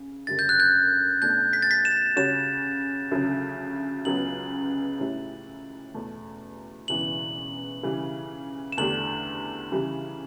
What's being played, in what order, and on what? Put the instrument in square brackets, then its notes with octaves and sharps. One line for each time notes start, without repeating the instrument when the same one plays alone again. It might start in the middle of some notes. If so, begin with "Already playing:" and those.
Already playing: [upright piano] C#3
[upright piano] F#1 F#2 D3 G3 [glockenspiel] A6
[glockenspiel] G6
F#6
G6
[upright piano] B2 A3 D4 [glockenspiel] G6
[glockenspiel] B6
A6
B6
E7
[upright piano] C#3 G3 C#4 F#4 C#5 [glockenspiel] E7
[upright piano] D2 C#3 F#3 C#4
[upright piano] C#2 C#3 F#3 B3 [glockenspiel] F#7
[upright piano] A2 G3 C#4 E4
E2 B2 A3
[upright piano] E1 E2 C#3 E3 B3 [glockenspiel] F#7
[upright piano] C#3 E3 G3
[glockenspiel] E7
[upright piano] E2 D3 A3 D4 G4 [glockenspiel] F#7
[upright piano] C#3 E3 G3